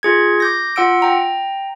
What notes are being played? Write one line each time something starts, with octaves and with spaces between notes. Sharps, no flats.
F4 G#4 G#6
D6 G6 A#6
F4 F#5 E6 D7
G5 A#5